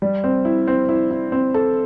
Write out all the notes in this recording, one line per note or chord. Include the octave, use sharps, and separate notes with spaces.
G3
C4
E4
C4
E4
E4
C4
A4